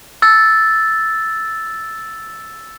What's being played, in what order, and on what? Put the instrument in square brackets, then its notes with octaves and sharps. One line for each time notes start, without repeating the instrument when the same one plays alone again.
[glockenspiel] E6 A6